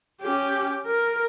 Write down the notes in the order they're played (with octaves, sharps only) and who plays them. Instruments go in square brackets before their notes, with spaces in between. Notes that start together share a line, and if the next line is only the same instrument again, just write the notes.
[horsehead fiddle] C#4 G4
A#4